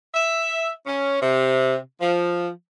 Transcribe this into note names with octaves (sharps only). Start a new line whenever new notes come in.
E5
C#4
C3
F3